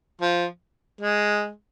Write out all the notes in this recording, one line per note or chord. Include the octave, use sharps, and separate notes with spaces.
F3
G#3